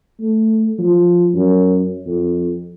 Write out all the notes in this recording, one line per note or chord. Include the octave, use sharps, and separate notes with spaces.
A3
F3
F#2
F2